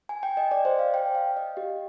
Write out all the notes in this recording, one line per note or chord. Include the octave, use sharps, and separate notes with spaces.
G#5
G5
D#5
D5
C5
F5
G5
F5
D#5
G4